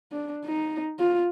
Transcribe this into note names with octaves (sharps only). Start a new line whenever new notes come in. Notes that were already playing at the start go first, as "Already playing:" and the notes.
D4
D#4
F4